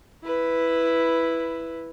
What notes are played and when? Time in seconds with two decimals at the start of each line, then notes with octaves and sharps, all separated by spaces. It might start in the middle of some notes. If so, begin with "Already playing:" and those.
0.24 E4 B4